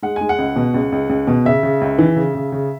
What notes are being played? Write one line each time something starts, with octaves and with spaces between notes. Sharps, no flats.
G#3 F#5
G#3 G#5
F#5
C#2
B2
C#2
C#2
C#2
B2
C#3 E5
C#3
C#2
E3
C#3
C#3
C#3